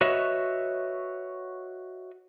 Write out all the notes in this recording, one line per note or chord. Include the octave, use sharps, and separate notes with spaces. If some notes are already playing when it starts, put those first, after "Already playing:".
F#4 B4 C#5 D#5 E5